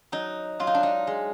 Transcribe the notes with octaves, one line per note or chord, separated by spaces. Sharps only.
F#3 D#4
F#3 F4
D#4
D4
D#4
G#3